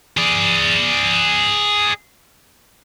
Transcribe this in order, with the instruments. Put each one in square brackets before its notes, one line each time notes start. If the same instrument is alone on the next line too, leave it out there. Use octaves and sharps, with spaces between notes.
[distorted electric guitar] G#4 D5